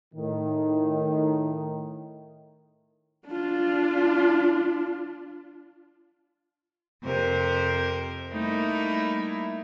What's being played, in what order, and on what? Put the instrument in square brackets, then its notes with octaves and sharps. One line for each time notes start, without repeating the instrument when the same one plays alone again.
[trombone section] A2 D#3
[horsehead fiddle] D4 F4
[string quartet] F2 C3 G4 A#4 C5
G3 A3 A#3 D#4 E4 A#4